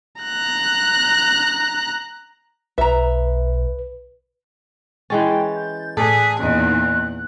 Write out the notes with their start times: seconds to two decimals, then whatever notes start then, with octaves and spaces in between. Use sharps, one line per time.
0.22 A#5 F#6
2.78 B1 B4 E5 A#5
5.10 E3 G#3 C#4 G5 A6
5.56 G6
5.97 A2 G#4 A4 D5 A5 F#6 B6
6.39 E2 A#2 C#4 D#4 F#6